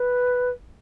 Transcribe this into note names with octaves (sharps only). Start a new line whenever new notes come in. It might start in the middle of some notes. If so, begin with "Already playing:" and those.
Already playing: B4